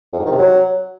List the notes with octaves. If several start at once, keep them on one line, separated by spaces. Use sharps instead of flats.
F2
G#2
D#3
C3
F#3